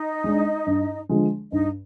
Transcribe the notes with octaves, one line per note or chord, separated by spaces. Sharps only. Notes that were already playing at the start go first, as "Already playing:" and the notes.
Already playing: D#4 D#5
G#3 D4
G2
D3 F3 G#3
G2 D#4 D#5